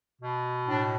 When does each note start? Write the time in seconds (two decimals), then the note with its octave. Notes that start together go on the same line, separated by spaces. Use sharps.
0.21 B2
0.67 A2 D4